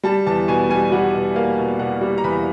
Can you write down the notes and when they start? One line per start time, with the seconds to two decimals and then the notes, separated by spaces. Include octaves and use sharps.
0.04 G3 A5
0.27 E2 A5
0.48 B2 G#5
0.69 G3 G#5
0.92 G3 F#5
1.14 B2
1.36 A#3 F5
1.58 B2
1.79 B2 F#5
2.01 G3
2.18 A#5
2.24 E2 B5